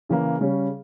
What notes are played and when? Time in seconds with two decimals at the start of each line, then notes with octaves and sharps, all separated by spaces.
0.09 C#3 E3 A#3
0.41 C#3 G3 C#4